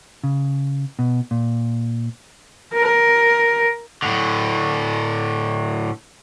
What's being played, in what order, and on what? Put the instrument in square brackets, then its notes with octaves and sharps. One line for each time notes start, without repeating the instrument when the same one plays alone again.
[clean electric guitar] C#3
B2
A#2
[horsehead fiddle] A#4
[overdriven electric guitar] A2 D3